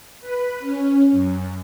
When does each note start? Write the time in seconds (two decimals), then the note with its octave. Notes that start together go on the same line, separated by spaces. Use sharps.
0.21 B4
0.60 C#4
1.12 F#2